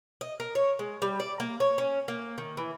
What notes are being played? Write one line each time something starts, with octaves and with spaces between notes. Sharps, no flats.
D#5
A#4
C#5
G#3
G3
D5
A#3
C#5
C#4
A#3
D#3
E3